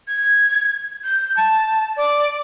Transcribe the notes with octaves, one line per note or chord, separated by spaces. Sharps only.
G#6
G6
A5
D5